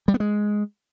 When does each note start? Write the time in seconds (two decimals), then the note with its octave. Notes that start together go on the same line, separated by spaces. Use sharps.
0.08 G3
0.14 B3
0.20 G#3